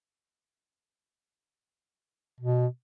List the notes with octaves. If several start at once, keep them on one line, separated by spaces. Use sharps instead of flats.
B2